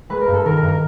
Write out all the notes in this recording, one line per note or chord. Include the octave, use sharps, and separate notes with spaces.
G#3 B4
A#4
G2
A4
D#3 A#4
A#4
G2
A#4